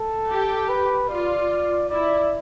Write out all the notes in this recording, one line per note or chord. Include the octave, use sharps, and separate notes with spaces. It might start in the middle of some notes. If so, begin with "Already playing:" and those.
Already playing: A4
G4
B4
F4 D5
E4 D5